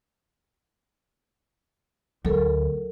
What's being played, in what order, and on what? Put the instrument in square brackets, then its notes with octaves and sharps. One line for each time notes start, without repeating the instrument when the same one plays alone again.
[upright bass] D2 [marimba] F#3 A4 A#4